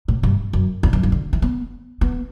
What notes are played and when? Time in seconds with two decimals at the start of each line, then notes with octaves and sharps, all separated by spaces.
0.08 A2
0.23 G2
0.53 F#2
0.83 E2
0.93 F#2
1.03 G2
1.12 D3
1.33 E3
1.42 B3
2.01 B3